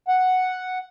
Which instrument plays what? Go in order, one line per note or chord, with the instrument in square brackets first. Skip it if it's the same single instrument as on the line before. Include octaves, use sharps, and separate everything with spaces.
[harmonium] F#5